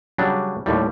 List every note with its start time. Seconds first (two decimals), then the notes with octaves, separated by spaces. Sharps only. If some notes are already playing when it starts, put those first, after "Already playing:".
0.18 C#3 F#3 G3 D4
0.66 D#2 A2 G3